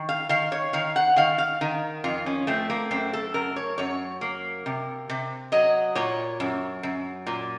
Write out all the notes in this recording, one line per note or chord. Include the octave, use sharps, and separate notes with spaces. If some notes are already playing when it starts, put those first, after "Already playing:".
Already playing: D#3
F5
D#3 F5
C#5
D#3 F5
F#5
D#3 F5
F5
D#3
F2 F4
C#4
A3 C4
A#3
F#2 C4
A4
F#2 A#4
C#5
F#2 C#5
A#3
C3
C3
F#3 D#5
A#2 C#5
F#2
F#2
A#2